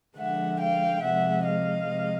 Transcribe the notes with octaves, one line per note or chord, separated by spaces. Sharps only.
D3 F3 G#3 E5 F#5
F5 G5
C3 F3 G#3 E5 F#5
D#5 F5
C3 F3 G#3